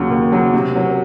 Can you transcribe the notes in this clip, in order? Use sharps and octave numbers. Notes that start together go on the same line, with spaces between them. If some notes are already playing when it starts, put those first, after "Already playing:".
Already playing: D#2 C#3 F#3
D#2
C#3 F#3
C3
F#3 C#4